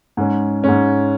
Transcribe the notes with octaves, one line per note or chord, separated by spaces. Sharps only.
G#2 G#3 C#4
G#2 G#3 C#4